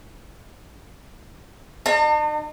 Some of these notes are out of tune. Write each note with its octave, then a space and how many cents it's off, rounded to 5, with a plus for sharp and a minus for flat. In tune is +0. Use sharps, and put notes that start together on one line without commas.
D#4 -45 A5 +45